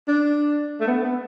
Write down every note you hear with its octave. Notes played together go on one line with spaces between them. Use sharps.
D4
A3
B3
B3